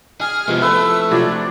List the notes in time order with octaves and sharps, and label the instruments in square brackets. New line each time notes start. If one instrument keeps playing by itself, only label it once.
[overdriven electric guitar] G#4 [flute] F6
[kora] C3 F3 E4 [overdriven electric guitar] G#3 B3
[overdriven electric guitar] A3 [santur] B4 [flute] E6
[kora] C3 F3 F#3 [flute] D4